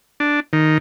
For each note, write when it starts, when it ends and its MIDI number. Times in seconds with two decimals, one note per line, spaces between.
0.20 0.40 62
0.53 0.78 51